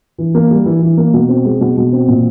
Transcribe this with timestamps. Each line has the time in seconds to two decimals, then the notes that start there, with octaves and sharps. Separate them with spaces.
0.18 E3
0.35 A#3
0.51 G3
0.66 E3
0.82 E3
0.97 A#3
1.13 B2
1.29 C4
1.45 G#3
1.61 B2
1.77 B2
1.93 C4
2.08 A#2